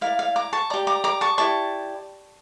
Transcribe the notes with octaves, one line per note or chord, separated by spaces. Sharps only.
E4 A#4 D5 F5
F5
A#5 D6
A5 C#6
G4 D5 A#5 D6
A#5 D6
A#5 D6
A5 C#6
E4 G4 D5 A5 C#6